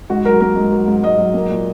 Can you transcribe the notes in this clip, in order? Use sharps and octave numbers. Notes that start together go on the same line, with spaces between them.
G#2 F#4
F#3 A#4
A#3 A#4
G#2
F#3
G#2
G#2 D#5
F#3
A#3
A#2